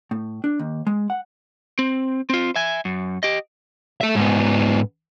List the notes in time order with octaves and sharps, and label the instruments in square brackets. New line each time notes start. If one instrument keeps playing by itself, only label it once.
[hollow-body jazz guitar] A2
D4
D#2
G#3
F#5
[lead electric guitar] C4
C4 F4
E5 G#5
F#2
G4 D#5
[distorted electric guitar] A4 E5
G#2 B3